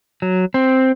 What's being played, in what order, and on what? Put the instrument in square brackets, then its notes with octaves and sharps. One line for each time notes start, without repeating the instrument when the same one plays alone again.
[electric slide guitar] F#3
C4